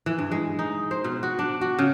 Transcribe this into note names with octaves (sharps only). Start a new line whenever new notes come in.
E3
G2
G#3
D#4
C5
B2
F#4
D4
F#4
C#3